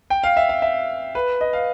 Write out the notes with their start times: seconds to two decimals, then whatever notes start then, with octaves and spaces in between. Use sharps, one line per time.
0.10 G5
0.24 F5
0.37 E5
0.49 F5
0.62 E5
1.15 B4
1.41 D#5
1.53 F5